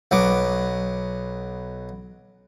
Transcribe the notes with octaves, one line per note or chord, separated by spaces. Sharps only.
B1 F#3 B3 D6